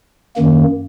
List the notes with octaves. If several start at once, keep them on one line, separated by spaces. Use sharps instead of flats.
F#2 D#3 A#3